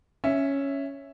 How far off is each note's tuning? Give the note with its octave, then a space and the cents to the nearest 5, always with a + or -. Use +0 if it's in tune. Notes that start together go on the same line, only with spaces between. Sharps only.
C#4 +0 E5 +0